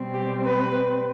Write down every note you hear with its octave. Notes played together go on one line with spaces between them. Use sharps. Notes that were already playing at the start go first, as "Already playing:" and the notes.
Already playing: B2 G3 C4
G4
B4